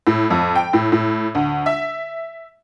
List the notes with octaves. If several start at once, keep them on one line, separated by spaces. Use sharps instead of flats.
A2
F2
G5
A2
A2
D2
E5